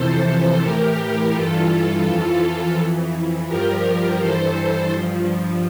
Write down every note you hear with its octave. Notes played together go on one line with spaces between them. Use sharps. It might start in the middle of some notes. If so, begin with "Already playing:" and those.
Already playing: F2 C3 E3 A4 C5
A2 E3 G4 A#4
G2 E3 F4 A4
F2 E3 F4 A4
F2 E3
G2 F3 G4 A#4
G2 E3 A4 C5
G2 F3